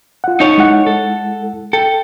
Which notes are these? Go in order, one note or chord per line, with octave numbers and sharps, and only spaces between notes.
F4 F#5
D#4 A4 C#5
G#3 E4 F#5
A4
A4 G5